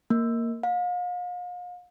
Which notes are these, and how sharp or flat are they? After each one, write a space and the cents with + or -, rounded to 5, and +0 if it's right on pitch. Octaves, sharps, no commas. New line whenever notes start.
A#3 -10
F5 +40